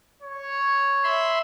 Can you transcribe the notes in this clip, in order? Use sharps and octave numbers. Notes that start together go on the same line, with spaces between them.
C#5
E5 B5 C6